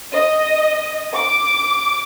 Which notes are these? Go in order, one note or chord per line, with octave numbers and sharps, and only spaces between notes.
D#5
D6